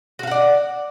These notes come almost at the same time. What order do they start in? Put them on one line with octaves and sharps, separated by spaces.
F#4 F5 F#5 D5